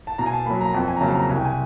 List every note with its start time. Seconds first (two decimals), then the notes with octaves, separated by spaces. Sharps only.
0.07 A5
0.18 B2 A#5
0.26 G#5
0.33 A5
0.46 A#3 B5
0.50 F#3
0.61 A#5
0.73 F2 A5
0.88 G#5
0.97 A#5
1.01 C#3 F#3 A#3 A5
1.15 A#5
1.29 C2 G#5
1.37 G5
1.44 G#5